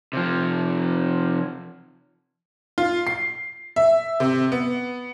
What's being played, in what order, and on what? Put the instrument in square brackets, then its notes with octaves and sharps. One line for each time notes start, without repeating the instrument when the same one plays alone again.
[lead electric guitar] C3 F3
[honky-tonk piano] F4
C7
E5
C3
B3